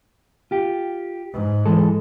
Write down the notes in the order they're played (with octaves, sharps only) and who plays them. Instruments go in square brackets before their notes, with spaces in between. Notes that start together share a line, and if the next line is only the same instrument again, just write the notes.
[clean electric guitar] F4 G4
[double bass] G#2
[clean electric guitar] E3 G#3 A4